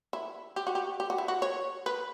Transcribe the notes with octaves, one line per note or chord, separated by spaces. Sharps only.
E4
G4
F#4
G4
G4
F#4
E4
F#4
C#5
B4